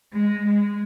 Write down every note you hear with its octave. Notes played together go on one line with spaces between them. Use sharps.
G#3
G#3